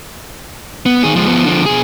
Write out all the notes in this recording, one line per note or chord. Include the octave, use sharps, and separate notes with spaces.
B3
D#3 G#4
F3 G#3
F3 B3
D3 F3
B2 G#4